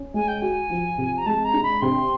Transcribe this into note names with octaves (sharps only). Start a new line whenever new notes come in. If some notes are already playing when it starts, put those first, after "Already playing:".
Already playing: C#4
G#3 G#5
G5
F#4 G#5
F3
C3
A#5
G#3 A5
A#5
D4
B5
C3 C6